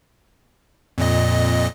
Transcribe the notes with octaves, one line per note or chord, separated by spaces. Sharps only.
F2 A#2 D#5